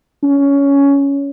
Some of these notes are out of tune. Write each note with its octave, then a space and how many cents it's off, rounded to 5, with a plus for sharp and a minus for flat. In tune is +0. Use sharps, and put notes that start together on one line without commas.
C#4 +15